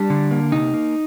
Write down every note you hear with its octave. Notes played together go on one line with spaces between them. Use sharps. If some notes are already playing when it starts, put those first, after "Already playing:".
Already playing: G3 D4
D3
A#3
C3 D#4
A#3